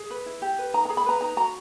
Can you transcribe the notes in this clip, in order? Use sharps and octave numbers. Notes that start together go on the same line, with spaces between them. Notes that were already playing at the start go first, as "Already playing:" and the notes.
Already playing: G#4
B4
E4
G4
B4
D#4 A#5
A#5
G#4
B5
B4 A#5
D#4 A#5
F#4 A#5